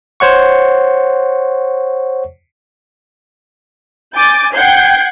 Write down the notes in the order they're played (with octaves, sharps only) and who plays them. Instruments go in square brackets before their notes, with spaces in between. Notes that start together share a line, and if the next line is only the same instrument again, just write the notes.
[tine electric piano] C5 C#5 F#5 C#6
[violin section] G#5 D6 G6 A6
F#5 G5 G6 G#6 C7